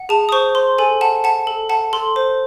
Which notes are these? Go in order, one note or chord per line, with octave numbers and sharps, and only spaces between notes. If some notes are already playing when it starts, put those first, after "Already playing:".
Already playing: F#5
G#4 A5
D#6
C5 C#6
C5 C6
A4 G#5
F#5 A5
F#5 A5
A4
F#5 A5
A4 C6
C5